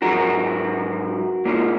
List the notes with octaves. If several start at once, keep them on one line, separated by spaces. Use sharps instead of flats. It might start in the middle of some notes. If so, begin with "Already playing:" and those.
G#2 F#3 F#4 A#4
A#2 G#3 A#3 C#4